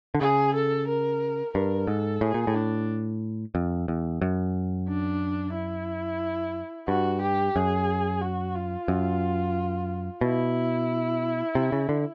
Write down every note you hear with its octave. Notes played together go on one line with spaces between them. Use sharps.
D3
C#3 G#4
A4
A#4
G2 A#4
G#2 A4
A2 G#4
A#2
A2
D4
F2
E2
F#2
D4
E4
G2 F#4
G4
F#2 G#4
F#4
F4
F#2
B2 E4
C3
C#3
D3